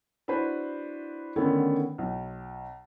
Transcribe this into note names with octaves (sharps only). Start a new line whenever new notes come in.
D4 E4 F#4 B4 C5
D3 D#3 A3 B3 C#4
B1